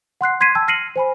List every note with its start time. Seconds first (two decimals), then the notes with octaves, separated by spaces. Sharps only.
0.21 F#5 C6 F#6 C7
0.40 C6 G#6 B6 C7 D#7
0.55 G5 A5 E6 G#6
0.68 F6 A#6 C7 C#7 D#7 F#7
0.96 C5 G#5 B5